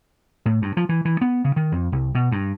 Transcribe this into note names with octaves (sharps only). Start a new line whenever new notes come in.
A2
G2
F3
E3
E3
B3
C#3
D#3
F2
C2
B2
G2